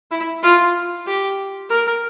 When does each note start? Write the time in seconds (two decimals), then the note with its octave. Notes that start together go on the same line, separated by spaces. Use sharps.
0.11 E4
0.43 F4
1.06 G4
1.69 A#4